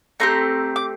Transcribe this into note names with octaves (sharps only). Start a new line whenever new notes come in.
A3 C4 G4 A#5
D6